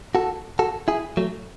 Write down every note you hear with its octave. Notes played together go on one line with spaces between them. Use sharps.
F#4 A4
F#4 A4
E4 G#4
F#3 A3